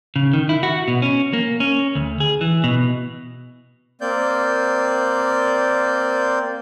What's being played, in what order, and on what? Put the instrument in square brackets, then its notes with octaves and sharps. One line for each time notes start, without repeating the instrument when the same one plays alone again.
[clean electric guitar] C#3
D#3
E4
F#4
B2
C#4
A#3
C#4
D2
G#4
E3
B2
[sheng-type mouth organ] A#3 C4 D5 G6